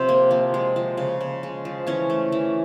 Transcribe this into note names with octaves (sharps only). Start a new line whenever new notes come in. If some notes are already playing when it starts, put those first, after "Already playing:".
Already playing: C3 F3 C4
A#3
F3
G#3
F3
C#3
C#3
G#3
F3
E3 C#4
A3
E3